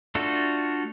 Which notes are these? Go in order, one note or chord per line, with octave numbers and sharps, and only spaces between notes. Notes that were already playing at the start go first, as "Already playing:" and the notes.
A3 D4 F4 F#4 A4